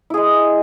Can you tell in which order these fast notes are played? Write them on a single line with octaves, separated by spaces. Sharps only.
E4 G#4 G#3